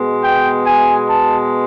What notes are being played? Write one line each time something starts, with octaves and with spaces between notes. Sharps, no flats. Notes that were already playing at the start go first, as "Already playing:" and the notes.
Already playing: B2 G#3 B3
G5
G#5
A5